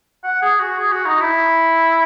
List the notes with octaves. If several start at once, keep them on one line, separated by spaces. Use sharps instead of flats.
F#5
G#4
F#4
G#4
F#4
D#4
E4